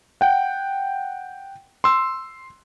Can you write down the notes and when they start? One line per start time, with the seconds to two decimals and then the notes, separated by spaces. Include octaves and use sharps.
0.21 F#5 G5
1.84 C6 E6